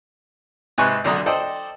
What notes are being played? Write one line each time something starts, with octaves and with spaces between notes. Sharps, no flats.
G#2 C3 B4 G#5 C#6 F#6
B1 F#2 D3 D4 A#5 D#6
A4 C5 D5 D#5 G5